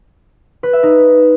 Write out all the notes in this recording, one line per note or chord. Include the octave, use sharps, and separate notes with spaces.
B4
E5
D#4